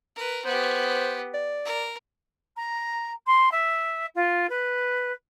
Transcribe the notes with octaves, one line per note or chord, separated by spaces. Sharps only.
A#4 B4
B3 G4 C5
D5
A#4
A#5
C6
E5
F4
B4